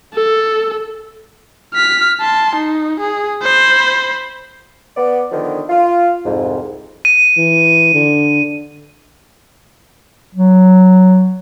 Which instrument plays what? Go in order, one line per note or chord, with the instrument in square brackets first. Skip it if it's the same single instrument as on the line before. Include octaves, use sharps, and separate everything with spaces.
[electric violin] A4
F6 B6
A5 C6
D#4
G#4
C5 B5
[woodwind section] B3 D5
D3 D#3 F3 B3
F4
C2 F2 G#2
[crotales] D#7
[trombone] E3
D3
[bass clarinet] F#3